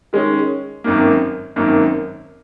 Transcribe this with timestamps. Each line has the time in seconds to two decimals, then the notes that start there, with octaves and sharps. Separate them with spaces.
0.13 D#3 G#3 C#4
0.84 G#1 F#2 D#3 A#3
1.56 G#1 F#2 D#3 A#3